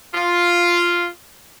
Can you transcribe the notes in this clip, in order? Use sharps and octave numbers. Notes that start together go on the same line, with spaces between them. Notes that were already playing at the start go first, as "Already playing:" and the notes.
F4